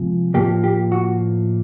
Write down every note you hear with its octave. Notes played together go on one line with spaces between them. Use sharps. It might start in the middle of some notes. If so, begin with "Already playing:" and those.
Already playing: C3 F3 G#3
A2 F3 A#3 G4
G4
F#4